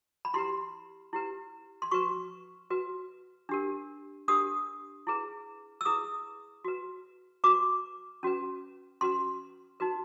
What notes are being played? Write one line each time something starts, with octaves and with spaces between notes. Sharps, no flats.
B5
E4 G4 B4 C6
E4 G4 B4
C6
F#4 B4 C#6
F#4 B4
D4 G4 A#4
D4 G4 A#4 D#6
E4 G#4 B4
E6
E4 G#4 B4 D#6
F#4 B4
F#4 B4 D6
C#4 F#4 B4
C#4 F#4 B4 C6
D#4 F#4 B4